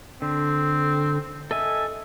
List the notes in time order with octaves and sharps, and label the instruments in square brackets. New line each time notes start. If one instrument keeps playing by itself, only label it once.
[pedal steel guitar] D3 [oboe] C4
[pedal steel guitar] A4 D#5 G#5 [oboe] E5